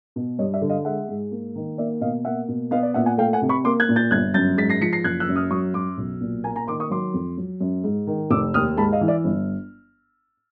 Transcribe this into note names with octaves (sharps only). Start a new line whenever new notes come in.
B2
G2 C#5 D#5
D5 E5
D3
D#5 F5
G#3 E5 F#5
G#2
A#3
D#3
A#3 D5 E5
B2 D#5 F5
A#3 E5 F#5
B2
B3 D#5 F5
D5
A#2 E5 F#5
F#5 G#5
A3 F5 G5
F#5 G#5
C3
B5 C#6
A#3 C6 D6
F#6 G#6
A#2
G6 A6
G1 F#6 G#6
F#2 G6 A6
G#2 A6 B6
A#6 C7
F3 B6 C#7
A#6 C7
F#1 F#6 G#6
E6 F#6
F#2
D#6 F6
F#3 C#6 D#6
F#2 C6 D6
B1
A#2
A#3 G#5 A#5
G#5 A#5
D#3 C6 D6
C#6 D#6
F#3 C6 D6
F2
F#3
F#2
G#2
D#3
F1 D6 E6
D#2 D#6 F6
G#2 A5 B5
D#5 F5
E3
D5 E5
G1